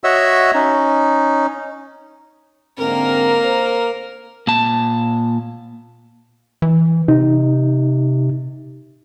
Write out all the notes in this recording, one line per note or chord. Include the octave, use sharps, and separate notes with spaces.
F#4 C#5 D#5 E5 F#5 E6
C#4 D#4
G#2 D3 A#3 C4 A#4
C5
A#2 A5
E3
C3 D#4